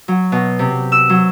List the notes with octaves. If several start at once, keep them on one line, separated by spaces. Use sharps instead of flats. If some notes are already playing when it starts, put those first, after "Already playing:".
F#3
B2
C3
E6
F#3